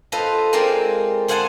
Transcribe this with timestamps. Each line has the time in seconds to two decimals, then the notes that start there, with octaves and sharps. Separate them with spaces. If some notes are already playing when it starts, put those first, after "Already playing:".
0.12 F4 A4 B4 C5 D#5
0.53 G#3 C4 A#4 D5 F5 G5
1.28 G#4 C5 F5 F#5 G#5 A5